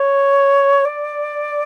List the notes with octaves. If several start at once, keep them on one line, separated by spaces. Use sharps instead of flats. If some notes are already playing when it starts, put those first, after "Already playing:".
Already playing: C#5
D5